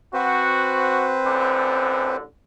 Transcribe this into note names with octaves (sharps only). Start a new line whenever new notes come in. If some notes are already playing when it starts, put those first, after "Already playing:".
C4 F#4 B4 C5
A1 F#2 D3